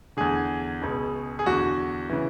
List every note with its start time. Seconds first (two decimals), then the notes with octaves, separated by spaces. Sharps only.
0.17 E2 D3 G#4
0.82 C#2 B2
1.39 G#4
1.46 E2 D3 F#4
2.09 C#3 E3